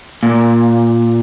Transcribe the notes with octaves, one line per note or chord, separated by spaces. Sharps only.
A#2